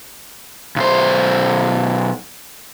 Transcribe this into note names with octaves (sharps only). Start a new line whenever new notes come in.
B1 C5